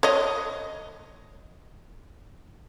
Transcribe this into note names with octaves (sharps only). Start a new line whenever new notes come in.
C#5 D#5